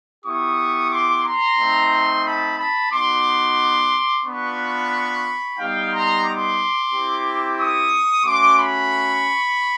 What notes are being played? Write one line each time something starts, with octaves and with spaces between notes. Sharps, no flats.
B3 E4 G4 C#6 D#6
C6 D6
A#5 C6
A3 C4 D#4
A5 B5
A5 B5
B3 D#4 F#4 C6 D6
B3 D4 F4 B5 C#6
G3 B3 D#4 G4 F5 G5
A#5 C6
C6 D6
C4 E4 G4
C#6 D#6
A3 C#4 F#4 C6 D6
B5 C#6